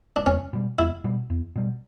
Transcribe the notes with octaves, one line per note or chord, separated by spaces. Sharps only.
D4
E2 C#4
B2 G3
E2 E4
B2 G3
E2
B2 G3